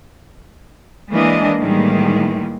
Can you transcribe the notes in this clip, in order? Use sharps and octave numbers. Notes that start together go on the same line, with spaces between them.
E3 G#3 A#3 D4 D#5
A2 D#3 E3 G3 G#3 A#3